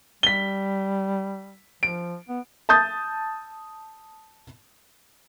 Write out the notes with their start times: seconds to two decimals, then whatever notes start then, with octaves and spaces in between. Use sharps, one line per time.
0.23 G3 B6 G7
1.83 F3 D7
2.29 B3
2.69 A5 D#6 G6 A6